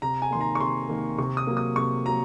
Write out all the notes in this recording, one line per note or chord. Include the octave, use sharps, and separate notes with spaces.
C3 A#5
G#5
D#3 A#3 C6
A#5
C#6
C3 C6
D#3 A#3
C3 C#6
D#6
F#3 A#3
D#6
C3 C#6
F#3 A#3 A#5